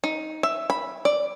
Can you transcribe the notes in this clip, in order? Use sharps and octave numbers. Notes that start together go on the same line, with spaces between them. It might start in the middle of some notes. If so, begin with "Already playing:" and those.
D#4
E5
B5
D5